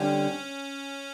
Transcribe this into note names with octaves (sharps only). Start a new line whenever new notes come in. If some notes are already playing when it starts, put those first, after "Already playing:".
Already playing: D3 G3 C4 C#4